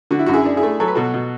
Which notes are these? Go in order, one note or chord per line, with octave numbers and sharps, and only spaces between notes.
D3 F#4
E4
F#2 F#4
E4 G#4
D4
E4 G#4
A3
F#3 A4
B4
B2 F#4 A4
B2